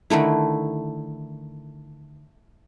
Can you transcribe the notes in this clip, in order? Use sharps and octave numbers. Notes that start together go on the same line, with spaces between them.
D3 D#3 A3 E4